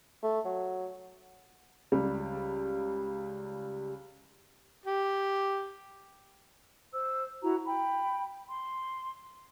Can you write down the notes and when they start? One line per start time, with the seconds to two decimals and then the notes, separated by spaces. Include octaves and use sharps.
0.23 A3
0.45 F#3
1.92 C#2 G3
4.86 G4
6.93 C5 E6
7.42 E4 F#4 A#5
7.65 G5 B5
8.48 C6